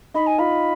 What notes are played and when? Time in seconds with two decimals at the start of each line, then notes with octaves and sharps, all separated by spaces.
0.14 D#4 B5
0.27 G#5
0.38 F4 B5